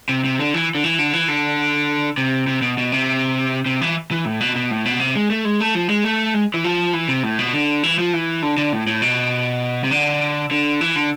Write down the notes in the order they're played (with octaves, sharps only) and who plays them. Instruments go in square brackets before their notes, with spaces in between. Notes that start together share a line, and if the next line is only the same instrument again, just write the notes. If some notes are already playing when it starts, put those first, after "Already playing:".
[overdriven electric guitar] C3
C3
D3
E3
D3
E3
D3
E3
D3
C3
C3
B2
B2
C3
C3
E3
E3
A2
B2
B2
A2
B2
C3
G#3
A3
G#3
A3
F3
G#3
A3
G#3
E3
F3
E3
C3
A2
B2
D3
E3
F3
E3
D3
D3
A2
A2
B2
C3
D3
D3
E3
D3